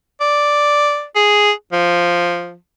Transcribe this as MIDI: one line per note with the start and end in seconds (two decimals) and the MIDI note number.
0.21 1.05 74
1.16 1.52 68
1.73 2.55 53